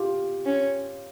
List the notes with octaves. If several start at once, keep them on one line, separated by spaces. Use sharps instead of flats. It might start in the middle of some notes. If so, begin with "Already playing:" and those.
Already playing: F4 G4
C#4